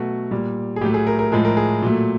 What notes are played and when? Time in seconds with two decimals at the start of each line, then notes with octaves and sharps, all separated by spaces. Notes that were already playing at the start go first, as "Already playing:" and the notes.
Already playing: B2 F#3 A3 F#4
0.31 A#2 G3
0.76 G#4
0.81 A2 F#3 A3 G4
0.94 G#4
1.07 A#4
1.19 A#4
1.32 A2 F3 G#3 G#4
1.45 A#4
1.57 G#4
1.82 A#2 F#3 A3